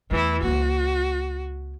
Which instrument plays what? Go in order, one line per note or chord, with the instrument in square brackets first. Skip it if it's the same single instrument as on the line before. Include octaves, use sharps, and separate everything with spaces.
[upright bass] E2 A3 [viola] E3 E4
[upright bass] C#2 A#3 [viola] F#4